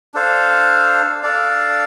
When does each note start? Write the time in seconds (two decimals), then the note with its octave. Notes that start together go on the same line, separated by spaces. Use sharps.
0.14 D4 A4 C5 F5
1.23 D4 A4 D5 F5